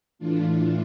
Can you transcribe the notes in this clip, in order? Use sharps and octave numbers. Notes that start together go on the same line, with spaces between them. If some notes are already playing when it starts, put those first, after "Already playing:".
A2 E3 A3 D4 F4